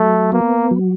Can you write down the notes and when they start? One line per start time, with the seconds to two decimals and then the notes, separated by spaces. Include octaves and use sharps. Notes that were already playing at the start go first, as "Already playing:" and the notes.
Already playing: F#3 A3
0.32 A#3 B3
0.71 F#3